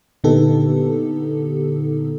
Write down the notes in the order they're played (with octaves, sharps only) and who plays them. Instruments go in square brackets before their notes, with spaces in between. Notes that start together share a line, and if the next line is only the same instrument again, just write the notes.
[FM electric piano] A#2 D3 B3 D#4 G4 A4